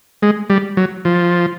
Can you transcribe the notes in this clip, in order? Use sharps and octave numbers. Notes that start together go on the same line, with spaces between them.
G#3
G3
F#3
F3